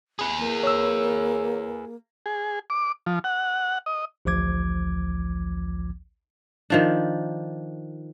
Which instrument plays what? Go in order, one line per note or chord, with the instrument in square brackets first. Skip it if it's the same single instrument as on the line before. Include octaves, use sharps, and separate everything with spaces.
[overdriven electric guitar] G#4 B4
[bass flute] A#3
[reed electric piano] C#5 E6
[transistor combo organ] G#4
D6
F3
F#5
D#5
[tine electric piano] A1 D2 F3 D6 G#6
[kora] D#3 F3 D4